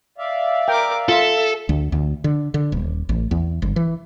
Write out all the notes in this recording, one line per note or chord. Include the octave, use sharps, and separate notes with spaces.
D5 E5 F5
A#4 G5 D6
F4 A4 E5
D2
D2
D3
D3
D#1
A1
E2
G1
E3